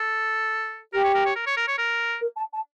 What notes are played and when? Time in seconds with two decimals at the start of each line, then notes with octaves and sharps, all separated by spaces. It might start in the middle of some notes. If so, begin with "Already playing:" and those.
Already playing: A4
0.93 G4 A#4
1.04 C#5
1.15 A#4
1.26 C#5
1.36 A#4
1.47 C#5
1.57 A#4
1.68 C#5
1.78 A#4
2.20 A#4
2.36 A5
2.53 A5